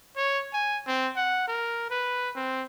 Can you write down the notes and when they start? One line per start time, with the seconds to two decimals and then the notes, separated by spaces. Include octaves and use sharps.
0.17 C#5
0.53 G#5
0.87 C4
1.16 F#5
1.48 A#4
1.90 B4
2.36 C4